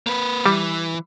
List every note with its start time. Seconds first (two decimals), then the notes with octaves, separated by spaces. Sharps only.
0.07 A#3 B4
0.46 E3 G3